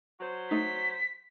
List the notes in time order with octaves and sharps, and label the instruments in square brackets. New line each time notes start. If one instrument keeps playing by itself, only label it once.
[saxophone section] F#3 F#4 C5
[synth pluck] A3 D#4 [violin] B6